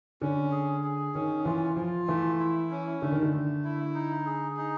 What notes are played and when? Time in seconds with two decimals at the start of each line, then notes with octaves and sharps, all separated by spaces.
0.21 D3 C#4
0.52 G#4
0.83 G#4
1.14 D#3 C#4
1.45 E3 F4
1.76 F3 F4
2.08 E3 A3
2.39 E4
2.71 C#4
3.02 D3 A3
3.12 D#3
3.22 D3
3.33 A3
3.64 E4
3.94 D#4
4.26 G#4
4.57 D#4